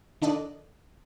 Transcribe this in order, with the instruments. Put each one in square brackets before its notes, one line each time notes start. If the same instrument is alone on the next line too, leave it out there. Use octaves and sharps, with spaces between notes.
[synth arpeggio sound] D#3 D4 A4 D5 D#5 F#6